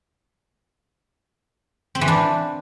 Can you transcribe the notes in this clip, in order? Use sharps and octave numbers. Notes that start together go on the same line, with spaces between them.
C4
E3
D4